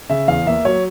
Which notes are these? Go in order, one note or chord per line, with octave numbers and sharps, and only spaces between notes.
C#3 E5
E2 F5
A#3 E5
F#3 C#5